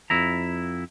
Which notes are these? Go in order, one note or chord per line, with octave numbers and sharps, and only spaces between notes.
F2 E4 A#5